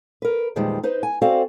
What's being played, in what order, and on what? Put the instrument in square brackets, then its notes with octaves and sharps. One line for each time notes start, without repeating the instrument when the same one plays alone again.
[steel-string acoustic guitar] A#4 B4
E2 A#2 D#3 F3 G3 G#3
D#4 B4 C5
G#5
C4 F#4 A4 C5 D5 F5